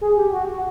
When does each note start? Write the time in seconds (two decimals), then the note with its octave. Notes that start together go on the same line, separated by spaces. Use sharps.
0.01 G#4
0.17 G4
0.32 F#4
0.48 F#4